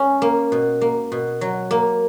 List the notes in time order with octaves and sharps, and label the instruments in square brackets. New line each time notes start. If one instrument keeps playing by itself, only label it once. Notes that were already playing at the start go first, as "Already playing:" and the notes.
Already playing: [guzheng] C#4 C#5
A#3
B2
A#3
B2
F#3
A#3